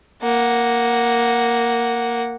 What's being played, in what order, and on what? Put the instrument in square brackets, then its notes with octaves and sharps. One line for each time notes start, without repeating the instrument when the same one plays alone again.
[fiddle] A#3 F#5